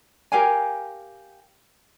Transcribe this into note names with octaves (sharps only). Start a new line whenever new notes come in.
G4 A#4 F5 G#5